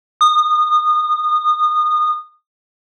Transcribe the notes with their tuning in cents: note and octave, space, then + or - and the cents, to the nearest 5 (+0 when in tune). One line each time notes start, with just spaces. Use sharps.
D#6 -25